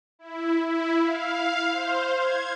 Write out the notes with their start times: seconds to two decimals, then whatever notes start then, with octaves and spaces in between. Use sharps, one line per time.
0.19 E4
0.68 E4
1.01 F5
1.70 C5
2.15 G#6